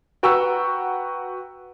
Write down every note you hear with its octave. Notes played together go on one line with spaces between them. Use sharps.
F#4 B4 G5 A#5 C#6 E6